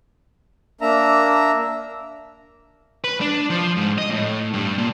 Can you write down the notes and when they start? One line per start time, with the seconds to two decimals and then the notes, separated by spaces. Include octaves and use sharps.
0.81 A#3 D4 E5 A#5
3.04 B4
3.21 D4
3.50 F3
3.77 G#2
3.98 D#5
4.11 A2
4.53 G2
4.78 A#2